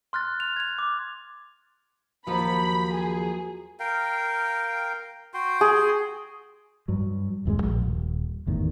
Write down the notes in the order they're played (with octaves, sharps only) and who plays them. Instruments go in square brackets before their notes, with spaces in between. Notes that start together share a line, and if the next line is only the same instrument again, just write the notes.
[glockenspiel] C6 F6 F#6 A6
F7
G#6 F7
D6
[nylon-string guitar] D#2 F3 F#3 [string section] B5
[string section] G#4
[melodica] A#4 F5 G5
F#4 G5 C6
[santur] G#4
[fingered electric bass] G2 F#3
D#1 F#2 F#3 G#3
A#1
D#1
G1 E2 A2 D#3